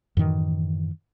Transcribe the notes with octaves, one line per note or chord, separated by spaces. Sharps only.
F#2 A2 D#3 E3